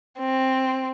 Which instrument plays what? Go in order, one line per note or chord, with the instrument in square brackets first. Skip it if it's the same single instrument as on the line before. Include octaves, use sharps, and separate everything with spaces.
[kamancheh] C4